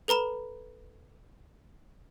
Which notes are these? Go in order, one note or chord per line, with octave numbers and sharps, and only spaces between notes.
A4 B4 A#5 B5 E7